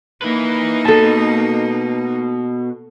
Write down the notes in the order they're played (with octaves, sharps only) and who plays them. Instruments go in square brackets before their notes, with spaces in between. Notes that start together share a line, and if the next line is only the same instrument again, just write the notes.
[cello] A#3 D#4 [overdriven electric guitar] E4 B4
[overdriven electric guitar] B2 [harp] A4 A5